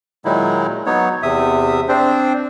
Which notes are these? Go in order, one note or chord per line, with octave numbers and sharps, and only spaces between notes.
A#2 D#3 F#3 G#3 D#4 E4
F#3 B3 D#4 C#5
E2 C3 E5 D#6
C4 D4 C5